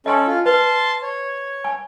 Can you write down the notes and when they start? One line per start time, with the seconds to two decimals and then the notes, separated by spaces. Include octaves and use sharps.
0.06 C#4 A4 D#5 G#5 C6
0.27 F4
0.46 B4 A5 C6
1.02 C#5
1.64 G#5